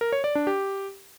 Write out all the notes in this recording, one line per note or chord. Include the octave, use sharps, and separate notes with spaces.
A#4
C#5
D5
D4
G4